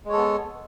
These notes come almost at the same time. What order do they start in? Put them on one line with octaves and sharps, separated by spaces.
G#3 C#5 A4 B3